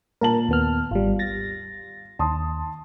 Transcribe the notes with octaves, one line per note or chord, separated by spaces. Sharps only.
A#2 A#4 A5 F#7
D#2 B3 F6
G#1 G3 F4
A6 A#6
D#2 A5 C6 D#6